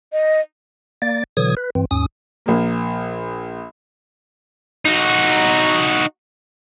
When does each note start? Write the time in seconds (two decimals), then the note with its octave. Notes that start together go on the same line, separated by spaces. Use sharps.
0.12 D#5
1.02 A#3 D5 A6
1.37 B2 D3 E3 F#3 D#6 G#6
1.57 B4
1.75 G2 E3 C4
1.91 D#2 G#2 C#4 D#6
2.46 A#1 A#3
4.85 D#4 F#4